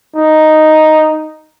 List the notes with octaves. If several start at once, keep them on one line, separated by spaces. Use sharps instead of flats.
D#4